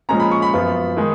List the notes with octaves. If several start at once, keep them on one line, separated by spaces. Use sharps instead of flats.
A#2 F3 G#3 C#4 A#5
B5
C#6
B5
F#2 F3 B3 F4
D#3 G#3 D#4